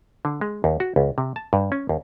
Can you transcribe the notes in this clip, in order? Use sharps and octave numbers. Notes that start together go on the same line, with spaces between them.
D3
G#3
D#2
F#4
C#2
C3
A5
G2
C#4
D#2